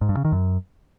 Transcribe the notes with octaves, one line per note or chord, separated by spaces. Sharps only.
G#2
G2
C#3
D#3
F#2